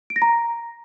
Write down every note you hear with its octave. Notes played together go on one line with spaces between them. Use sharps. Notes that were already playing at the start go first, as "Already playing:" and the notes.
D7
A#6
A#5